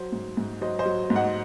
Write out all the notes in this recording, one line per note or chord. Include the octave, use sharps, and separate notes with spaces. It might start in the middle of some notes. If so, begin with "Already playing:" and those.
Already playing: F#3 C5
G#2
G#2
F#3 C5 D#5
C5 D#5
F#3
G#2
D#5 F#5